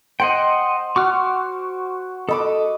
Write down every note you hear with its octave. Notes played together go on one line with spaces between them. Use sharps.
C5 D#5 F#5 G5 C6
F#4 C#6 D6 F6
A4 D#5 B5 D6